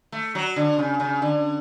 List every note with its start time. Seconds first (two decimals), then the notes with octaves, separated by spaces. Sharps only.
0.12 A3
0.35 F#3
0.56 D3
0.78 C#3
1.00 C#3
1.22 D3